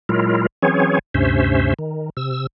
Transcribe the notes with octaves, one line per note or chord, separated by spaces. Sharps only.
A#2 F#3 G#3 E4 F4 A#4
E3 F#3 C4 C#4 G#4 C#5
D2 G2 C3 C#4 C5 E5
D#3
C3 E6